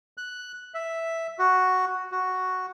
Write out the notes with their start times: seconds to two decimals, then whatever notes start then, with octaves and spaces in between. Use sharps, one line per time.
0.18 F#6
0.74 E5
1.39 F#4
2.12 F#4